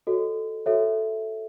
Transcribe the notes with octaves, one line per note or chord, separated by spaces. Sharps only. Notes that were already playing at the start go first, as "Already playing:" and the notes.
F#4 A4 C#5 D#5
F#4 A4 C#5 E5